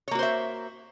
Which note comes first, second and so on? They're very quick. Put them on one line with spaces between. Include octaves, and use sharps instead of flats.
C#5 A#3 F#4 C5 E5